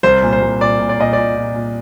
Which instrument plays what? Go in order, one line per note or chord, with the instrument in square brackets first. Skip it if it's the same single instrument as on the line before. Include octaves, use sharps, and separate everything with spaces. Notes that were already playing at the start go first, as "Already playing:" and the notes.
[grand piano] C2 C5
A#2
C5
C2
A#2 D5
A#2
D5
A#2 D#5
A#2 D5
A#2
A#2